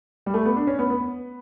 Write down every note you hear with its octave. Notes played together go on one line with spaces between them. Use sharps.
G3
A3
B3
D4
C#4
B3
B3